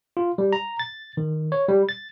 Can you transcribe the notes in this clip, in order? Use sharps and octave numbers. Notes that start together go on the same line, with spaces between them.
F4
G3
A#5
A6
D#3
C#5
G3
A6